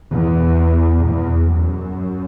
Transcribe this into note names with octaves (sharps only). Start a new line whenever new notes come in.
E2
E2
F#2